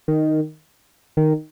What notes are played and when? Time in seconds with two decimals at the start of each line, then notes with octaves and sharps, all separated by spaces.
0.08 D#3
1.17 D#3